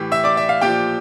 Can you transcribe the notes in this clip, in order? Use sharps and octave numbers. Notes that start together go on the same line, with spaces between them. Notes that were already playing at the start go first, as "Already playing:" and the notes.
Already playing: A2 E3 G4
E5 E6
D5 D6
E5
F5
A#2 F3 G4 G5